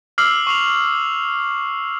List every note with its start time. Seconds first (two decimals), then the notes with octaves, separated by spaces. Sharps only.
0.18 D6 E6 F6 C7 F#7
0.47 C#6 C7 F7